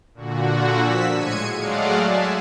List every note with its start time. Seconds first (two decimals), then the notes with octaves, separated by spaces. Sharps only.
0.14 A#2 D3 F#4
0.80 F3 E6 B6
1.13 A2 G#3 G#6 C#7 D#7
1.54 F#3 G#3 A3 D5 F5 F#5
2.03 E5 G#5 A5